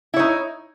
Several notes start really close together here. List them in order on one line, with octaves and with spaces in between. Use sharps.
E4 C#5 D#4